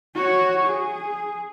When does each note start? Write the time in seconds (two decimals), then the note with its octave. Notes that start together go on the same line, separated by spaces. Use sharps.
0.14 F#4 C#5
0.65 G#4